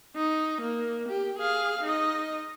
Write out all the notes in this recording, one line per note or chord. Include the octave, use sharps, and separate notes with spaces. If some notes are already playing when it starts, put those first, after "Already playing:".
D#4
A#3
G4
G#4 F5
D#4 D#5